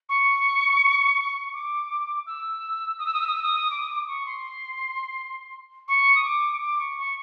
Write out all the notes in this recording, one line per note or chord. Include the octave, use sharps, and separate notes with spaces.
C#6
D6
E6
D#6
E6
D#6
E6
D#6
E6
D#6
D6
D#6
D6
C#6
C6
C#6
D#6
D6
D6
C#6
C#6